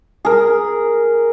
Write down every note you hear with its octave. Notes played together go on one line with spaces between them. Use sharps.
G#4 A#4